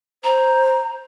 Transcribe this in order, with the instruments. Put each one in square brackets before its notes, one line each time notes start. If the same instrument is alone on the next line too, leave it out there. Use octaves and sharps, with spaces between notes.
[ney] C5 [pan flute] A#5